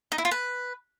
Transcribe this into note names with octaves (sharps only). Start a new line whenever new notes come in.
D#4
E4
F4
B4